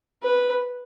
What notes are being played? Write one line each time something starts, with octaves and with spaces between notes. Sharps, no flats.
B4